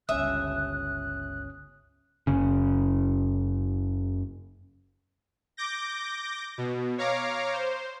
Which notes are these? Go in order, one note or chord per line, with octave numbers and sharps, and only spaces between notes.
G1 C#2 C#4 E5 D#6 F#6
F#1 C#3
D6 G6 A#6
B2
C#5 F5 A#5 D6
C5